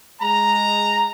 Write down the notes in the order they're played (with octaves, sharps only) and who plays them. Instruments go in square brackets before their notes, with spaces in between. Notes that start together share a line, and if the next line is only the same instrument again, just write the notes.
[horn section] G#3 A#5